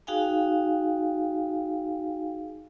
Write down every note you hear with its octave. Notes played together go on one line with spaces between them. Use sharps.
D#4 F#4 G#4 F5 G5 G#5